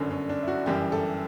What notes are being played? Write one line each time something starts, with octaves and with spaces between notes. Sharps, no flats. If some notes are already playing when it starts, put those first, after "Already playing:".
Already playing: G1 F#2 D3 C#4
C#4
D4
E4
F#4
G1 F#2 E3 G3 G4
A4